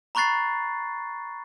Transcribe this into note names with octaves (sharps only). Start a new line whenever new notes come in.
A#5 B5 C#6 F#6 A6 C7